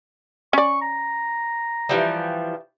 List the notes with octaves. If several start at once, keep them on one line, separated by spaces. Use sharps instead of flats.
C#4 D5 C#6
A#5
E3 F3 G3